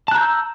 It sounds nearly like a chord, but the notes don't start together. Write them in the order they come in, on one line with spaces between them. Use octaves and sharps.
A5 F#6 A#5 G6 E6